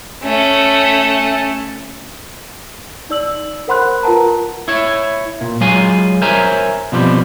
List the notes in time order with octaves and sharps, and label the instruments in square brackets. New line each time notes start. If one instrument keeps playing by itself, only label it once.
[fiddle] A3 C#4
[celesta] D#4 D5 E6 F#7
A#4 C5 F#5 B5 C6 F#6
F4 A#4 B4 F#5 A5 A#5
[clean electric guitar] E4 C#5
A#2
F#3 G#3 F4 F5 G#5
A#4 C5 C#5 E5 G#5 A#5
B2 F3 G3 C4